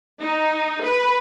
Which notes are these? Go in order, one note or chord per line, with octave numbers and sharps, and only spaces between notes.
D#4
B4